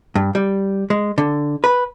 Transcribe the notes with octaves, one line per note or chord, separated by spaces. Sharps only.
G2
G3
G#3
D3
B4